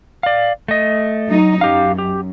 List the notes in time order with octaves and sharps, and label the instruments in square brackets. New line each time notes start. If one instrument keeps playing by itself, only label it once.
[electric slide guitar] D5 F5
A3 D#5
[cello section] F#3 D#4
[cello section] F#2 [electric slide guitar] G4 F5
[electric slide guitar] G4